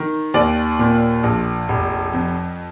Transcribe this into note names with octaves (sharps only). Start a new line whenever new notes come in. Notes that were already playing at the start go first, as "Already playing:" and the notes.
Already playing: D#3
D#2 D5
A#2
A#1
F1
F2